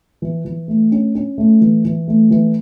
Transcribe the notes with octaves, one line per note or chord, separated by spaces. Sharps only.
E3
E3
A3
C#4
C#4
A3
E3
E3
A3
E3